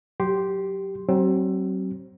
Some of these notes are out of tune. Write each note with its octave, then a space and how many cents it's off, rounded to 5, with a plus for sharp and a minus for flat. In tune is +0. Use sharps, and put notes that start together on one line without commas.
F#3 +0 G4 -5 C6 +0
F#3 +40 C4 +25